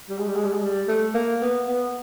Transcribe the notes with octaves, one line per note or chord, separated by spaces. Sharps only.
G3
G#3
G3
G#3
G3
G#3
G3
A3
A#3
B3
B3